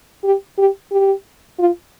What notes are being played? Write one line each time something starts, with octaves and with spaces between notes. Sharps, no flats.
G4
G4
G4
F4